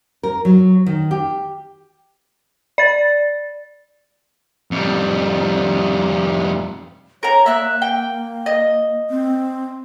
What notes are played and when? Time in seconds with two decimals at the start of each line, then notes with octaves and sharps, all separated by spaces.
0.23 A#4
0.45 F#3
0.86 D#3
1.11 G4
2.78 D5 A6
4.71 F2 G3
7.23 A#4 C#5 A#5
7.46 A#3 E5 F#6
7.82 G5
8.46 D#5
9.10 C4